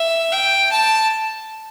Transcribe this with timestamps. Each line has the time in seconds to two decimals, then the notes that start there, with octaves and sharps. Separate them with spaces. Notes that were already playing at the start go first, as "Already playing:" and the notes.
Already playing: E5
0.32 G5
0.71 A5